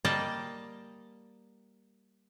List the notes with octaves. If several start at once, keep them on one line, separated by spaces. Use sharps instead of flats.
G3 A#3 D5 D#5 G5 A5